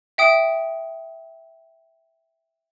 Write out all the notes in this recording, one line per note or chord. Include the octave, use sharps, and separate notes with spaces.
E5 G5 D#6